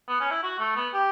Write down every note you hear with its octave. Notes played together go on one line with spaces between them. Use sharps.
B3
C#4
E4
F#4
A3
B3
G4